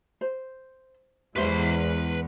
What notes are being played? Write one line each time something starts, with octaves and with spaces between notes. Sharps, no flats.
C5
E2 E3 G#3 G4 B4 C5 E5 C6